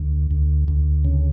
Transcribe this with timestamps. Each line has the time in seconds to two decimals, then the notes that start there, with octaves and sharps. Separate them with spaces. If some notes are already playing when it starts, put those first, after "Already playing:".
Already playing: D2
0.31 D2
0.68 D2
1.05 C#3